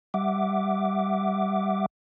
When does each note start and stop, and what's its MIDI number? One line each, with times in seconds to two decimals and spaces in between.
0.14 1.86 55
0.14 1.86 76
0.14 1.86 78
0.14 1.86 86